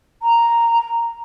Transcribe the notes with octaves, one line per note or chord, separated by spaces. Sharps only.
A#5